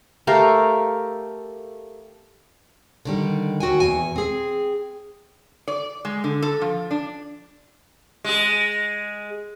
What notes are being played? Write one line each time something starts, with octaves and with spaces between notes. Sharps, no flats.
A3 G4 A#4 F5
D3 D#3 G3
D#2 F#4 G5 G#5
E2 G#5
C4 G#4
D5
G#3
D3
A4
F3
D4
G#3 G#4